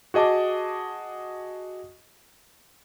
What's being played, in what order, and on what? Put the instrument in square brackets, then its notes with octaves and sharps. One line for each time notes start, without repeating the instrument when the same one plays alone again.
[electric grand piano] F#4 G#4 D#5 A5 D6